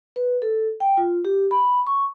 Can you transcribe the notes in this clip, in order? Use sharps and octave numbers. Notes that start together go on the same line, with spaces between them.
B4
A4
G5
F4
G4
B5
C#6